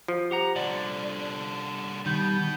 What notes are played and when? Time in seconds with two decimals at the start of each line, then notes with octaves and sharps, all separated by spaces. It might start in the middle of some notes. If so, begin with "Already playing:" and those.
0.08 F3
0.31 G4 F#5 A#5
0.56 C2 D3 D5
2.06 B2 D#3 G3 B3 G6